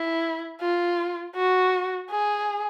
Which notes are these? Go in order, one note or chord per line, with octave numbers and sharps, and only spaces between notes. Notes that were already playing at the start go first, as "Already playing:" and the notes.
Already playing: E4
F4
F#4
G#4